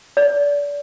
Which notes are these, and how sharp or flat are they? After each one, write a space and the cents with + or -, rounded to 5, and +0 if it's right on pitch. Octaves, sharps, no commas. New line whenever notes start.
D5 -30